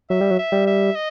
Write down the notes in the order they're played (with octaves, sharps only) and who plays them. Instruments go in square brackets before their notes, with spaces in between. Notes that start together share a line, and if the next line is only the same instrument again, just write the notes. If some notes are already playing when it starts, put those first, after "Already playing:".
[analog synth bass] F#3 [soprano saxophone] E5
[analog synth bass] G3
F#3
[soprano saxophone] E5
[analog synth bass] G3
[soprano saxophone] E5
D#5